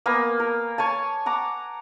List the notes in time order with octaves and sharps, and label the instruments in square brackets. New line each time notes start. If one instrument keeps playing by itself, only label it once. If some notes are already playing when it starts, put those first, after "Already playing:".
[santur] A#3 B3 G#5
A#4
C#5 G#5 A5
F#5 A#5 D6